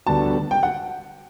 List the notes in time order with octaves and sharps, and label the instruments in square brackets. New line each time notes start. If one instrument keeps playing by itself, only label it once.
[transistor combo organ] D2 D3 G3 B3 F#4 [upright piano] A5
[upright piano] G5
F#5